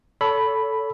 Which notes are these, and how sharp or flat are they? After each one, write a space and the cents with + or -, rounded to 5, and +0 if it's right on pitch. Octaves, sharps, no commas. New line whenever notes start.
A4 +0 C#5 +35 B5 +0